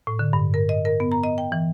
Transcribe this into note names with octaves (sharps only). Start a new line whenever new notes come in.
A2
D3
G2
A#4
D#5
A#4
B3
A#5
D#5
G5
E3